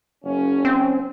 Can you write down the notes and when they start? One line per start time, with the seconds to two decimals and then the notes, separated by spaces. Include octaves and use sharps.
0.24 F#1 C#4
0.65 C4